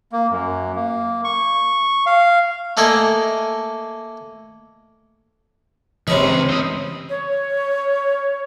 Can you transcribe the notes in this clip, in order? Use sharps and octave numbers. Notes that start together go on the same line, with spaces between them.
A#3
F#2
A#3
C#6
F5
A3 A#3 A4 D5 D#5 G#5
C#2 C3 E3 C#4 G#4 B4 C#5
C4 D#5
C#5